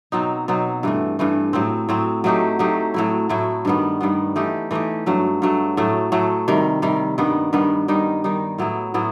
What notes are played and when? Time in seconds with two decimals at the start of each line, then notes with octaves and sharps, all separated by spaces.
0.12 B2 F#3 C4 D#4
0.48 B2 F#3 C4 D#4
0.83 G2 E3 A3
1.19 G2 E3 A3
1.53 A2 F#3 C4
1.89 A2 F#3 C4
2.24 F#3 A3 D#4 G4
2.59 F#3 A3 D#4 G4
2.94 A2 F#3 A3 E4
3.29 A2 F#3 A3 E4
3.65 G2 D#3 G3 B3
4.01 G2 D#3 G3 B3
4.36 E3 A3 D#4 G4
4.71 E3 A3 D#4 G4
5.06 G2 F#3 A3
5.42 G2 F#3 A3
5.77 A2 F#3 A3
6.12 A2 F#3 A3
6.48 C3 D#3 G3
6.82 C3 D#3 G3
7.18 G2 D#3 G3 B3
7.53 G2 D#3 G3 B3
7.88 D#3 G3 D#4
8.24 D#3 G3 D#4
8.58 A2 F#3 B3 E4
8.94 A2 F#3 B3 E4